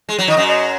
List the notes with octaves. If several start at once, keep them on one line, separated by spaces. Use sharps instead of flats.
G#3
F#3
D#3 D#5
F#2 F#3
D#5